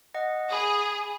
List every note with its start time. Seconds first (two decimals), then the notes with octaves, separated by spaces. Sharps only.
0.14 D#5 F#5
0.50 G#4 B5 D#6